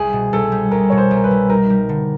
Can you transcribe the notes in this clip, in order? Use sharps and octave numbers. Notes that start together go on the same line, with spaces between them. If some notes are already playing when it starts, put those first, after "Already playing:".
Already playing: C2 G#4
B2
C2 A4
G3
C2 A#4
B2 C#5
C5
C2
A#4
B4
G3
D#4 A#4
G3
D3